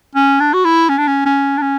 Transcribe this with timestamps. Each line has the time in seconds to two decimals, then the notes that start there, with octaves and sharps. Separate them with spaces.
0.15 C#4
0.40 D4
0.54 F#4
0.65 E4
0.90 C#4
0.98 D4
1.08 C#4
1.26 C#4
1.58 D4
1.62 C#4